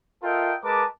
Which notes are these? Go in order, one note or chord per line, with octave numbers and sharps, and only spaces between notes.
F4 A4 A#4 D#5 E5 G5
G#3 A#4 B4 A5 D6